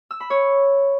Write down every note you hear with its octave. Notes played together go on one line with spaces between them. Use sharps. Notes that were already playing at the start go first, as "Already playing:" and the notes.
E6
B5
C#5